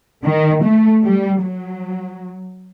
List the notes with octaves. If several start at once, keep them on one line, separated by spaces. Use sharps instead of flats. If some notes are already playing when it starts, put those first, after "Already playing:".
D#3
A3
G3
F#3